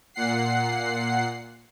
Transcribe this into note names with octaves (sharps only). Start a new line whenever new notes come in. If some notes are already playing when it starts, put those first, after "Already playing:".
A#2 F#5 C7